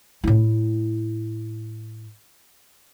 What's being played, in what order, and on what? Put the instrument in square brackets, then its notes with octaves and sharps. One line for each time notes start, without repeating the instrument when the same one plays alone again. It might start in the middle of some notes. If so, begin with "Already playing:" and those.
[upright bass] A2 E4